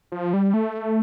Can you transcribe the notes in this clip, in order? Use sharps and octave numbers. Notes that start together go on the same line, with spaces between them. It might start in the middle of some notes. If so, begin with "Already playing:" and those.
F3
G3
A3